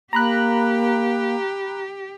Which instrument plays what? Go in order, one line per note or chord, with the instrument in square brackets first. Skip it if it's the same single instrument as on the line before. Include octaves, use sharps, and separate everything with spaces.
[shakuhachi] A#3 [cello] G4 [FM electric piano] A#5 B5 F#6